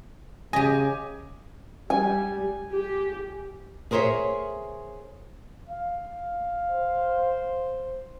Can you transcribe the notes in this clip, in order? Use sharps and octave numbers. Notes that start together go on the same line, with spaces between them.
C#3 G4 D#5 G#5
G3 G#5
G4
G#4 A#4 C5 C#5 E5
F5
C5